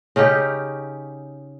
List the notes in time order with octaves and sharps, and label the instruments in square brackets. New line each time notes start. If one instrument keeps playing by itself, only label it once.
[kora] C#3 C#4 D#4 G4